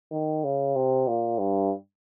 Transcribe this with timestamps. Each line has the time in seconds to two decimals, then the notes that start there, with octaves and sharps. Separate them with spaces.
0.11 D#3
0.44 C#3
0.75 C3
1.07 A#2
1.39 G2